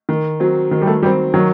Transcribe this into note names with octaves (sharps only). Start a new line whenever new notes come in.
D#3
F#3 C4
D#3
G3
A3
F#3 G3 C4
D#3 F#3